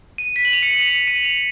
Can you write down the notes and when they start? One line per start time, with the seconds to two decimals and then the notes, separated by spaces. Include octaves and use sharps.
0.18 D#7
0.36 B6
0.45 F#7
0.53 F7
0.63 C#7
0.71 D#7
0.89 C#7
1.07 D#7
1.25 F7